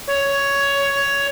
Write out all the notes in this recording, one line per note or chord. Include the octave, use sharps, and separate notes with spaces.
C#5